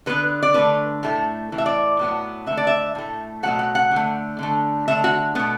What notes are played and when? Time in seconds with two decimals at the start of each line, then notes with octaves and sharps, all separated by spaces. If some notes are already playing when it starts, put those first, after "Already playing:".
0.06 D3 B3 B4
0.43 D5
0.54 D3 A3 B4
1.03 A2 A3
1.52 A2 E3
1.58 E5
1.66 D5
1.99 A2 F#3 B3
2.46 D3 A3 E5
2.57 D5
2.67 E5
2.95 A2 A3
3.43 B2 F#3 A3 F#5
3.59 F#5
3.75 F#5
3.91 D3
3.96 A3
4.39 D3 A3
4.88 D3 E5
4.90 A3
5.04 F#4
5.35 B2 A3 B3